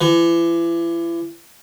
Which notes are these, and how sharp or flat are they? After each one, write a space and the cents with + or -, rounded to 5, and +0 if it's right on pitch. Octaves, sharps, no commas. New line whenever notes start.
E3 +35